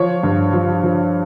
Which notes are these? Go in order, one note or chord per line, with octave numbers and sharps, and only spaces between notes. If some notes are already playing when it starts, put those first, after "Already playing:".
Already playing: F3 C#5
G2
F3
F3